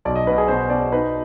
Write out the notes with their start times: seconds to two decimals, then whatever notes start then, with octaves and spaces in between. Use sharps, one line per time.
0.05 B1 D5
0.16 D#5
0.27 B2 B4
0.38 G#4
0.48 B2 C5
0.70 B2 D5
0.92 D#4 B4